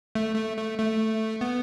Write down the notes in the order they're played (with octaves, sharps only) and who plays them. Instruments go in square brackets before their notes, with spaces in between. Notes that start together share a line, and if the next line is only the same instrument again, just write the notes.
[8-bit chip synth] A3
A3
A3
A3
B3